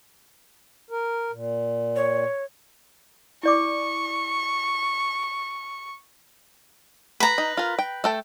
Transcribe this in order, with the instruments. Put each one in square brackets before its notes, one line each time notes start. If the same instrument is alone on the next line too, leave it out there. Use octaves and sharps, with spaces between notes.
[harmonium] A#4
A#2
[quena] C#5
[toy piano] E4 D5 D6 [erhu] C#6
[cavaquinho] B4 A#5
[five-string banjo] D#4
F4 A#4
G5
A3 A4 G5